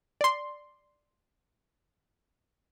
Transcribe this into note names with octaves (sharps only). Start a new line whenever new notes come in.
D5 C6